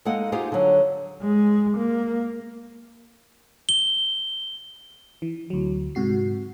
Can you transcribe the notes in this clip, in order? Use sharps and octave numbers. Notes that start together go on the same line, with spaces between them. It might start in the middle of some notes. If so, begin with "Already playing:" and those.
G#3 A#3 D#4 A4 D#5 F#5
D#4 F4 G4 G#4 C5 F5
D3 F#3
G#3
A#3
G7
E3
D2 F#3
G#2 C3 F#4 C7